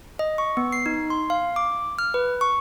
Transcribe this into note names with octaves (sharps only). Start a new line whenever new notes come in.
D#5
C#6
B3
C7
D#4
C6
F5
D6
F6
B4
C#6